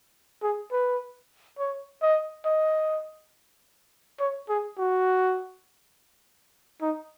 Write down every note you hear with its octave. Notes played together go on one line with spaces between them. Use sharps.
G#4
B4
C#5
D#5
D#5
C#5
G#4
F#4
D#4